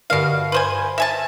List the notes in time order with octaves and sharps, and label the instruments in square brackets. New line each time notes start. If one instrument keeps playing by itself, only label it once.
[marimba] G2 D3 A#4 [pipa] B2 F5
[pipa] B4 C5 G#5
E5 G#5 A5